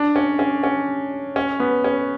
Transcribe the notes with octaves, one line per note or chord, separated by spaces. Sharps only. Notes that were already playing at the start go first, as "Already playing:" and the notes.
Already playing: D4
C#4
C#4
C#4
C#4
B3
C#4